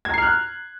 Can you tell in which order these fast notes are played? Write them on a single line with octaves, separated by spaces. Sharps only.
G#6 A#5 C7 F6 F#6